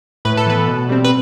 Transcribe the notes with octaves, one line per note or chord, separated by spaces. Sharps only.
A2 B4
A4
E3 B3 B4
B2
G3 C4
B4